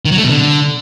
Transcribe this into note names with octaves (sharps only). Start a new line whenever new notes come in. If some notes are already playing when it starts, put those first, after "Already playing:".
D#3
F#3
A3
B2
D3